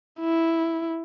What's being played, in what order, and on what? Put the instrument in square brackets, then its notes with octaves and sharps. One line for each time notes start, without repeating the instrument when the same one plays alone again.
[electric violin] E4